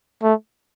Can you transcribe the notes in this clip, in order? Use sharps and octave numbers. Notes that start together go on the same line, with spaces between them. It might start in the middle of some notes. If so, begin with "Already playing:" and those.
A3